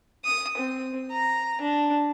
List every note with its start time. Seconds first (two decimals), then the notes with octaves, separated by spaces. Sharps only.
0.25 D#6
0.58 C4
1.11 A#5
1.61 D4